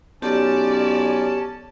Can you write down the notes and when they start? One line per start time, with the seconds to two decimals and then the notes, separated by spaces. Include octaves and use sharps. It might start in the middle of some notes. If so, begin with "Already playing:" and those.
0.22 B1 C#4 G4 D5 A5